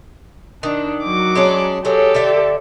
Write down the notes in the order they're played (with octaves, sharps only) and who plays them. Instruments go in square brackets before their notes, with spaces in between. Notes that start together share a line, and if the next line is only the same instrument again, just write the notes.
[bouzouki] D#3 [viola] D4
[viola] F#3 D6
[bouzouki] G#3 C#4 D4
[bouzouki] F#3 G#3 [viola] G4 A4
[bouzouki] D3 D5 E5